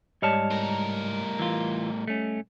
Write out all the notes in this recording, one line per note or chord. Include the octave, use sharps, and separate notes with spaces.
G#2 G3 C#5 D#5 A5 F6
A2 A#4
E3 F4
A3 C#4